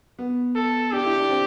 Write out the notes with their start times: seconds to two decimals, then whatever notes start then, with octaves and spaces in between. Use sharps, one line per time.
0.19 B3
0.55 A4
0.93 D4 G4
1.05 E4
1.18 D4
1.30 C4